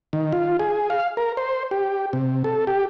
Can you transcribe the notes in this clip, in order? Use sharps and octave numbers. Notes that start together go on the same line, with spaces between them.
D#3
F4
G#4
F5
A#4
C5
G4
C3
A4
G4